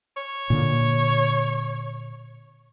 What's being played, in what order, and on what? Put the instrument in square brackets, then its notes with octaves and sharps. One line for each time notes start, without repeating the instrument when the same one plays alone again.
[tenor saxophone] C#5
[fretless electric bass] A#2 D3